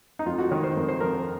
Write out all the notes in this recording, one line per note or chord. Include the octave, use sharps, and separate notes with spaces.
D#4
F2 F4
F#4
D#3 C#5
C5
F2 A#4
C5
F2 A#4